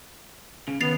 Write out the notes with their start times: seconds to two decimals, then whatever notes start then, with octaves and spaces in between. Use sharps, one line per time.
0.68 C#3
0.81 D#2 B3 A6 C7 F7